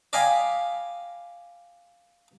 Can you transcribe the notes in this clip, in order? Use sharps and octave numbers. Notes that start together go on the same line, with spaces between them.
D5 D#5 F5 G5 G#5 B5